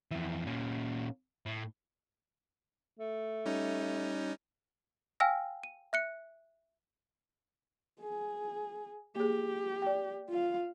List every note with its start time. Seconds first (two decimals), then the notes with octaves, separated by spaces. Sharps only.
0.11 F2 E3
0.46 A#2 C#4
1.46 A2
2.99 A3
3.46 G3 C#4 D#4
5.20 F5 G5 G#5 E6 F6 A#6
5.63 D#7
5.93 E5 F#6 C#7
8.00 G#4
9.16 A#3 G4 G#4
9.82 D5 G5
10.29 F4 F5